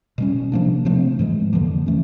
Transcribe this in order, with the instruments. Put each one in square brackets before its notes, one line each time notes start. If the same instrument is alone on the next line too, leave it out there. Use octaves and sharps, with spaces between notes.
[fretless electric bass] B2 G3 A#3 C#4
C3 F3 A#3 D4
C3 F3 A3 C4
G#2 E3 G#3
F2 D3 F3 A#3
E3 A3 C#4